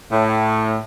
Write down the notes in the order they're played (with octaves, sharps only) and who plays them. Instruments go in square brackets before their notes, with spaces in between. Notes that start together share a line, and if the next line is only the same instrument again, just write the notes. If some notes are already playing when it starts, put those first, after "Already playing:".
[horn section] A2